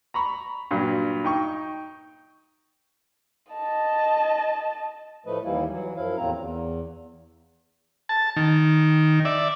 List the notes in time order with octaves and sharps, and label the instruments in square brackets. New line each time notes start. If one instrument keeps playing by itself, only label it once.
[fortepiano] A#5 B5 C#6
G2 A#2 F#3
D#4 G5 C#6
[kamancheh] D#5 A5
[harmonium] A2 F3 A3 B4 D#5
D#2 E3 G3 A#3 E4
E3 F#3
F#2 F3 E4 F5
E2 A2 A#3 C4 A#5
E2
[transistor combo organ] A5
D#3
D5 E5